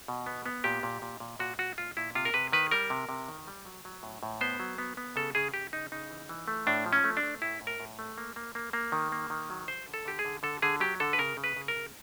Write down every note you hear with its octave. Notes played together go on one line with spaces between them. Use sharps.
B2
B3
B3
A#2 G4
A#2
A#2
A#2
A#2 F#4
A#2 F#4
A#2 F4
A#2 E4
C3 F4
A#4
C3 B4
D#3 B4
G3 A#4
C3
C3
D#3
G3
F#3
F#3
A2
A2
B3 C5
F#3
B3
B3
C#3 A4
C#3 G#4
C#3 G4
C#3 D#4
C#3 D#4
E3
E3
A3
A2 D4
F3
C#4
A3
D4
A3
A2 E4
A2
A#4
A2
A3
A#3
A#3
A#3
A#3
D#3
A#3
D#3
F#3
F#3 C5
D3
A4
D3 G4
G#4
D3
D3 A4
D3 G#4
F#3 G4
D3 A4
B4
C#3 A#4
C#3
B4
C#3
A#4
C#3